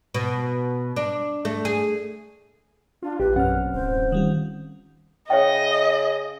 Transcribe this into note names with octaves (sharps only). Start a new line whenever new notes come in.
B2
D4
A3
G#4
D4 F4
A#1 G4 B4
F#2 B2 C4 C#4 F#5 F6
D1 C5
D#3 G3 F4
C#3 C#5 D#5 E5 G5